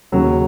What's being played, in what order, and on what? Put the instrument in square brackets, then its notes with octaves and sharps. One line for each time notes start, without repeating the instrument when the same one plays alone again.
[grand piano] D#2 C#3 F#3